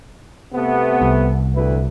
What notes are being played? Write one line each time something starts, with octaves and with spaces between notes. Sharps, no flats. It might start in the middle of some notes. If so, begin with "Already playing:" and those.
C3 A3 B3
C2
D2 E4 B4